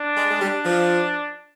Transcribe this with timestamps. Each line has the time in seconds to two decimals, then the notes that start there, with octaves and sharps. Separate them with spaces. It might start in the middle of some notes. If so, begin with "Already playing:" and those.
Already playing: D4
0.17 G#3
0.30 G#3
0.40 G3 D4
0.65 F3